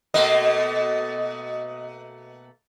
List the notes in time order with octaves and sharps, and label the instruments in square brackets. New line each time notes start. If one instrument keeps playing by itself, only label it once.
[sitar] B2 A3 A#3 [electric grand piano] D#5